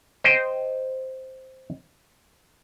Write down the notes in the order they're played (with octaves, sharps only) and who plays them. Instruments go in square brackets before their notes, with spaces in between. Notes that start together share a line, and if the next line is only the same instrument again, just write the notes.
[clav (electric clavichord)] C5 D#5 G5